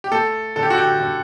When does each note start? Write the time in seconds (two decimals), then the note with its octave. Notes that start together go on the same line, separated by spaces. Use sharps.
0.04 G4
0.11 A3 A4
0.56 D3 A4
0.63 G4
0.70 F#4
0.78 G4
1.00 D3